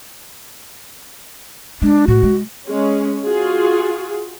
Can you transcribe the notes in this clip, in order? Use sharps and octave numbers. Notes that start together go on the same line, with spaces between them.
G#3 D4
A2 F#4
G#3
G#3 C#4
F4 F#4 G#4